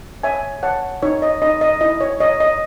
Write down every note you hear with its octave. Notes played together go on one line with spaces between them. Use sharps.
C#5 E5 G#5
C#5 F#5 A5
D#4 C#5
D#5
D#4 D#5
D#5
E4 D#5
C#5
C#5 D#5
D#5